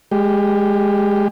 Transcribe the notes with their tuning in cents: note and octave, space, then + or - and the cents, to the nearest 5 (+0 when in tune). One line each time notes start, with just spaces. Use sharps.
G#3 +0 G4 +5